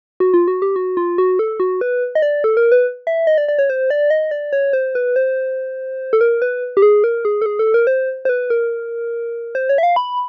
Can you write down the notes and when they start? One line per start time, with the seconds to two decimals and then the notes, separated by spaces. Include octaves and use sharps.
0.20 F#4
0.34 F4
0.48 F#4
0.62 G4
0.76 F#4
0.97 F4
1.18 F#4
1.39 A4
1.60 F#4
1.81 B4
2.15 D#5
2.22 D5
2.44 A4
2.57 A#4
2.72 B4
3.07 E5
3.27 D#5
3.38 D5
3.48 D5
3.59 C#5
3.70 C5
3.90 D5
4.10 D#5
4.31 D5
4.53 C#5
4.73 C5
4.95 B4
5.16 C5
6.13 A4
6.21 A#4
6.42 B4
6.77 G4
6.82 G#4
7.04 A#4
7.25 G#4
7.42 A4
7.46 G#4
7.59 A4
7.74 A#4
7.87 C5
8.25 C5
8.29 B4
8.50 A#4
9.55 C5
9.69 C#5
9.78 E5
9.83 F5
9.96 B5